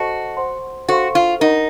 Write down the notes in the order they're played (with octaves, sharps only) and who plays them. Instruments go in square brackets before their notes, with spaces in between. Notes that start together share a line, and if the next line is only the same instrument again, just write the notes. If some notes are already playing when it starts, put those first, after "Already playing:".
Already playing: [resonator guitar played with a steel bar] F#4 [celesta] A4 C5 D#5 A5
[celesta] C5 F#5 C6
[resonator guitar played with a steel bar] F#4 [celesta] A4 C5 F5 C6
[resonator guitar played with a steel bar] F4
[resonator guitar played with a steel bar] D#4 [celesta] A#4 D#5 F#5